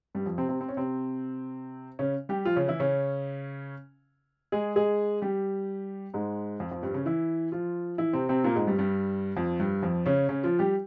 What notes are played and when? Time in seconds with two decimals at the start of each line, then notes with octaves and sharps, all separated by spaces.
0.15 G2 G3
0.26 F2 F3
0.38 C3 C4
0.49 C3 C4
0.61 C4
0.69 C#4
0.77 C3 C4
1.99 C#3 C#4
2.29 G3 G4
2.45 F3 F4
2.56 C#3 C#4
2.68 E3 E4
2.80 C#3 C#4
4.52 G#3 G#4
4.76 G#3 G#4
5.22 G3 G4
6.14 G#2 G#3
6.60 F2 F3
6.71 F2 F3
6.83 G2 G3
6.94 C#3 C#4
7.06 E3 E4
7.52 F3 F4
7.98 E3 E4
8.13 C3 C4
8.29 C3 C4
8.44 A#2 A#3
8.55 G#2 G#3
8.67 G2 G3
8.79 G2 G3
9.36 F2 F3
9.59 G2 G3
9.83 F2 F3
10.06 C#3 C#4
10.29 C#3 C#4
10.44 F3 F4
10.59 G3 G4